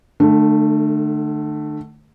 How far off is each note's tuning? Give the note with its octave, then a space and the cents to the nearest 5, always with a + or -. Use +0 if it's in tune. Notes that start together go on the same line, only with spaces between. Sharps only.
D3 +40 A3 +0